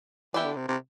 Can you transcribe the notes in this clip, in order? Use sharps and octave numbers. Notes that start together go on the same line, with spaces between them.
E3 B3 E4 G4 B4 D5
D3
C3
C3